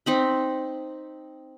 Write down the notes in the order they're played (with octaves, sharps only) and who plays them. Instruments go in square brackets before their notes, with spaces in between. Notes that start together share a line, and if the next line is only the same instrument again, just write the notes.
[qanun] C4 D#4 B5